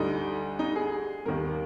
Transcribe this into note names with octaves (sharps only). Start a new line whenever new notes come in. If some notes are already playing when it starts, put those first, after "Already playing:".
Already playing: D2 D3 G3 D#4
D#4
G#4
D#2 D#3 G3 A#4